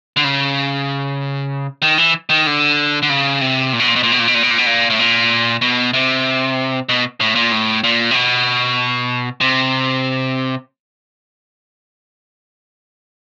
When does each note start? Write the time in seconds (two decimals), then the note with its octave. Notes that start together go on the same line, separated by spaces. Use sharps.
0.17 D3
0.24 C#3
1.82 D#3
1.98 E3
2.29 D#3
2.46 D3
3.02 D3
3.10 C#3
3.41 C3
3.73 A#2
3.80 B2
3.88 A#2
3.96 B2
4.03 A#2
4.12 B2
4.20 A#2
4.27 B2
4.34 A#2
4.43 B2
4.50 A#2
4.58 B2
4.66 A#2
4.90 A2
4.99 A#2
5.61 B2
5.94 C3
6.89 B2
7.21 A2
7.35 A#2
7.51 A2
7.84 A#2
8.11 C3
8.15 B2
9.41 C3